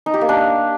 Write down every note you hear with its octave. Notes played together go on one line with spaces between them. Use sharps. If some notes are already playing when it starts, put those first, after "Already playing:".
D#4
G4
A#3
D4